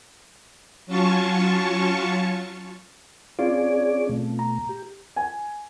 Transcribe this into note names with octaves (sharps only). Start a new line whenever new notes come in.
F#3 C#4 F4 A5 C#6
C4 C#4 F4 G#4 D5
B2 A3
A#5
G4
G#5